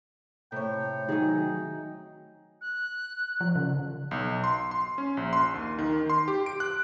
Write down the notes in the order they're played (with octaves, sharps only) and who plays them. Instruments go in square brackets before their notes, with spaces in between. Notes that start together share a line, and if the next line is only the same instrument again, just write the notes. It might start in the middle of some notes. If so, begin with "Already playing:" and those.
[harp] A2 [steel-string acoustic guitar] C3 C#5 [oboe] G5
[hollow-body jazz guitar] D#3 F#3 [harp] D#4 G#4 D#5
[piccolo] F#6
[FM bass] F3
C#3
[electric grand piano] B1
C6
C6
C#4
A#1
C6
D#2
D#3
C6
G4
D7
F#6